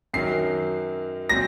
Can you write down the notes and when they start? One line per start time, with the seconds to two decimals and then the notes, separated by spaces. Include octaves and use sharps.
0.13 F#2 D#3 F#3 C7
1.29 A#2 F#3 C4 A#6